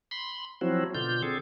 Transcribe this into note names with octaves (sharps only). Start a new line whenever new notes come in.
B5 C6
F3 F#3 C4 E4 F#4
B2 D3 F4 G6
D3 C4 G#4 A4